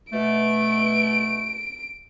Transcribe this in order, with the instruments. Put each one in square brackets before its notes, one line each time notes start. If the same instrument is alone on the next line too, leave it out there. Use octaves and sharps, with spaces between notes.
[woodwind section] B2 A3 [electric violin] D7